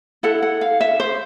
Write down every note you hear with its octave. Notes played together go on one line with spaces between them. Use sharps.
E4 A4 F#5
F#5
F5
E5
C5